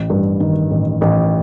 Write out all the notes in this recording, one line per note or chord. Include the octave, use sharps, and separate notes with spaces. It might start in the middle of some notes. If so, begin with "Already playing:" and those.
Already playing: A1
G2
D#3
A1
A1